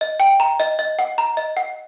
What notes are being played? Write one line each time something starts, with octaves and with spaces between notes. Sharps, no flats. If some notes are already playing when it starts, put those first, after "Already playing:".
D#5
G5
A#5
D#5
D#5
F#5
A#5
D#5
F#5